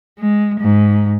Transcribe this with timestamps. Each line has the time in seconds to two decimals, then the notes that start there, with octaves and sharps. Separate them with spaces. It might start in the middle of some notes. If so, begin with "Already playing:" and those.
0.19 G#3
0.61 G#2